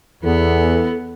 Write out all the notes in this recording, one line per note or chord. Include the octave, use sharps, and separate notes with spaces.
E2 E3 B3 A4